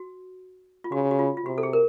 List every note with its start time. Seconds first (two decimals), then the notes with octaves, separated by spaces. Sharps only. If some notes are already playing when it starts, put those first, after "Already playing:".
Already playing: F#4
0.84 F4
0.92 C#3 F#4
1.11 F#4
1.19 F4
1.37 F4
1.45 C3 F#4
1.58 A4
1.63 G#4
1.73 A#4